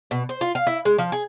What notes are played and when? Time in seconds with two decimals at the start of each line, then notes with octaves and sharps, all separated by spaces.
0.11 B2
0.29 C5
0.41 F4
0.55 F5
0.67 E4
0.85 G#3
0.98 F3
1.12 G#4